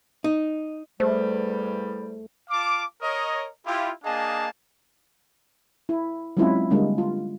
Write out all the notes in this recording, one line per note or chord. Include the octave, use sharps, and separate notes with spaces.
D#4
E2 G3 A3 C5
F4 F5 A5 D6
A#4 C#5 D#5
E4 F4 G4
A#3 D4 G#4 D#5 F5 A5
E4
F#3 G#3 C4 C#4 E4 F4
D3 G3 G#3 A#3 D4
F4